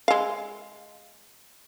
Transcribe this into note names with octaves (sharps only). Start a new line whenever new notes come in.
G#3 F5